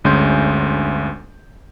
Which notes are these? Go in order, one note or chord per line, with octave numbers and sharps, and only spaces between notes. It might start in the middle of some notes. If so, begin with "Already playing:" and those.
G1 D2 G#3 C#4 C6 G6